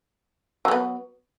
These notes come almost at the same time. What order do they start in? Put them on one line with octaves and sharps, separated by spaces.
F#3 F3 B3